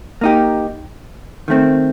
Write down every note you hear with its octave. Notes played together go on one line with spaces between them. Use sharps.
A#3 D#4 G4
D#3 A3 C4